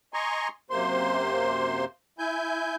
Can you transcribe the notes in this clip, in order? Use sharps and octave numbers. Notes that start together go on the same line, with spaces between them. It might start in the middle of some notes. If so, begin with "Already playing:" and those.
D#5 G#5 A#5 C6 C#6
F#2 C3 A#3 C5 C6
E4 G#5 G6